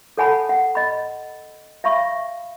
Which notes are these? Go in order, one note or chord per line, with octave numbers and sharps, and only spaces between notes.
A4 C#5 F#5 G#5 A5 B5
F#5
D#5 B5
E5 F5 B5 C#6